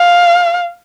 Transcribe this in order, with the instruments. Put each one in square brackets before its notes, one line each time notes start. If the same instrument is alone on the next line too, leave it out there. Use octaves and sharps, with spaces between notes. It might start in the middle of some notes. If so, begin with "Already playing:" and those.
Already playing: [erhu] F5